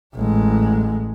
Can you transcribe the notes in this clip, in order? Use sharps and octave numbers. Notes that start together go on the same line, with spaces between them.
A1 G#3